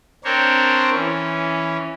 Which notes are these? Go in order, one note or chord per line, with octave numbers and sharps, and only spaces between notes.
C4 D4 A#4 C5 C#5
E3 C#4